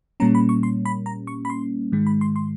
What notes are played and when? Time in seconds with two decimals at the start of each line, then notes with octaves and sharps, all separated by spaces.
0.20 A#2 G3 A#3 C#4 A#5
0.35 B5
0.49 C#6
0.63 C6
0.85 B5
1.06 A#5
1.27 C#6
1.45 B5
1.50 C6
1.92 G#2 D#3 G#3
2.07 B5
2.21 C6
2.36 C6